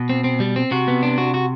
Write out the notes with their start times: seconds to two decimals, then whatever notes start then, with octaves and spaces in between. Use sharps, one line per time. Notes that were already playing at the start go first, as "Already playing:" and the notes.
Already playing: B2
0.09 C4
0.24 C4
0.40 G3
0.56 C4
0.71 C3 F#4
0.88 B3
1.03 D4
1.18 F#4
1.34 F#4